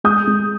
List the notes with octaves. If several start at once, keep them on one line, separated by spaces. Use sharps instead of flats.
G#3 D#6 G6
G#3